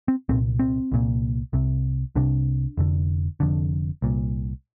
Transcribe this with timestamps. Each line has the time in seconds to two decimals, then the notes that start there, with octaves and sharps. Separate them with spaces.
0.08 C4
0.29 C2 A#2 C4
0.59 C4
0.92 C2 A#2
1.53 C2 C3
2.15 C2 C3 D4
2.77 F1 F2 D3
3.40 F1 F2 D3
4.02 C2 A#2